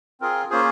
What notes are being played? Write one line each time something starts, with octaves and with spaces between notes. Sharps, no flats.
C4 F4 G#4 A#4
A#3 C#4 F4 G#4 C5